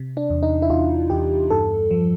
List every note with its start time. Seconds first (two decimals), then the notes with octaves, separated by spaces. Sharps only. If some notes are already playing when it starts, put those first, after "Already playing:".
Already playing: C3
0.17 D4
0.30 E2
0.43 D#4
0.62 E4
0.70 E2 F4
1.10 E2 G4
1.50 G2 A4
1.91 F3